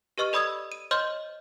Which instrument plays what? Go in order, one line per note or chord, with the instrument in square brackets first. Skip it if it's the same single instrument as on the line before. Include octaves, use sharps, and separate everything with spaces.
[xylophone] G4 B4 D#5 C#6 F6
A4 D5 B5 D#6 E6 G#6
D#7
C5 C#5 D#5 C6 F6 G6